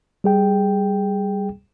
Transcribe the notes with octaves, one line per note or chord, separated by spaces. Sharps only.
G3 G#4 G5